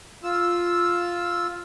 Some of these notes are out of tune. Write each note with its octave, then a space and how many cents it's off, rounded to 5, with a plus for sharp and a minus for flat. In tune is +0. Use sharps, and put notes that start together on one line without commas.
F4 +0 E6 +0